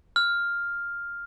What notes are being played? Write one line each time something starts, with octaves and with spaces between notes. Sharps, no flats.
F6